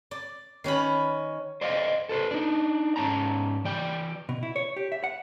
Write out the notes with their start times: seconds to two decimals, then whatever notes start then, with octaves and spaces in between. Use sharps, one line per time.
0.11 D5
0.64 D#3 C#4 B4 B5
1.61 C5 D5 D#5 F5
2.09 A4 B4 C5
2.31 D4 D#4
2.96 G#2 C#4 A5 A#5
3.65 E3 D5 G5
4.29 B2
4.43 E4
4.56 C#5
4.77 G4
4.92 E5
5.04 F#5